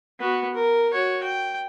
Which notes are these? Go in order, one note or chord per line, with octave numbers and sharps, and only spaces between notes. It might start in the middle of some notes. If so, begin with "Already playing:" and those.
B3 F#4
A#4
F#4 C#5
G5